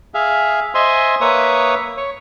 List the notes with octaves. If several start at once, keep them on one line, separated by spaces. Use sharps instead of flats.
G#4 E5 F5
C5 D#5 E5 G#5 C6
A#3 B4 C#5 E5 D#6
C#5